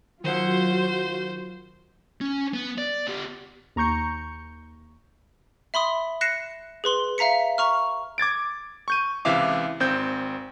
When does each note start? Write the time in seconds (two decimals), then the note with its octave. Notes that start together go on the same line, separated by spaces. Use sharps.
0.24 D#3 F#3 F4 F#4 C5 F#5
2.21 C#4
2.54 B3
2.78 D5
3.07 B3 G4
3.76 D#2 A#5 C#6 G6 C#7
5.74 E5 B5 C6 D#6
6.21 F#6 A#6 C7 C#7 E7
6.84 G#4 B4 C6 G7
7.18 E5 F5 A#5 B6 C#7
7.58 A#5 C#6 F6
8.18 D6 G#6 A6 D7
8.88 C#6 G6 D#7
9.25 C#2 C3 E3 E5 F5 D6
9.80 G#1 C4 G6